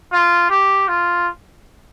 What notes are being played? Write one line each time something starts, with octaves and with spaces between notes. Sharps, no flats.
F4
G4
F4